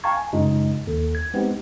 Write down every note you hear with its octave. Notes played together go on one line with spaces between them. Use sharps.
F5 G5 A5 A#5 C#6 G#6
G#5
F#2 C#3 G#3 D#4 F4
D#2 A4
G#6
G#3 B3 C4 D#4 G4